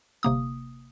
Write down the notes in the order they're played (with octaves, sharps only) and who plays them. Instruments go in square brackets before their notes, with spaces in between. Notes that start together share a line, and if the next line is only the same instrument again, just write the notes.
[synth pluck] G1 C3 A#3 D#6